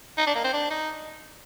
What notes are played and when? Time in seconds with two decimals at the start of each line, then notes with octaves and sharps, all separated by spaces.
0.18 D#4
0.27 D4
0.35 A#3
0.44 C4
0.53 D4
0.71 D#4